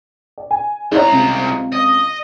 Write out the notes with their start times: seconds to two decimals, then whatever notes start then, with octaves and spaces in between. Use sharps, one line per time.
0.38 D5
0.51 G#5
0.92 C2 E4 C#5 A#5
1.12 C#2 C3
1.73 D#5